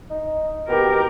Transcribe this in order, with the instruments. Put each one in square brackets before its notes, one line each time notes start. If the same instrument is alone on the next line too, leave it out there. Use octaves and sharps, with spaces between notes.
[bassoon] D#4
[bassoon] B2 [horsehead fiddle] G4 A#4